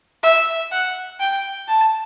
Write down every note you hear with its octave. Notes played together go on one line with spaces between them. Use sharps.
E5
F#5
G5
A5